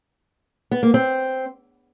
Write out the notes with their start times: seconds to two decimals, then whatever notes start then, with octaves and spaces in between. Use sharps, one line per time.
0.71 B3
0.83 A#3
0.94 C4